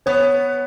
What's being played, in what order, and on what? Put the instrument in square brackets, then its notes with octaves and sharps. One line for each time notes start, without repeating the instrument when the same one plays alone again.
[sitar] B3 [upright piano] C#5